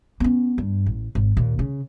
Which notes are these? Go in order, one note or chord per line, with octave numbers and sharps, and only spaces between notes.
B3 C#4
G2
A1
G#1
D#2 A#2
C#3